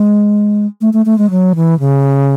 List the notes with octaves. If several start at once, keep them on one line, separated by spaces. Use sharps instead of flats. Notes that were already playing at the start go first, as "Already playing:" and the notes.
Already playing: G#3
A3
A3
A3
G#3
F#3
E3
C#3